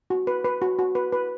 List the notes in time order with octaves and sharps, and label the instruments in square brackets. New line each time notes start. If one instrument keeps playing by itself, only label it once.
[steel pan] F#4
B4
B4
F#4
F#4
B4
B4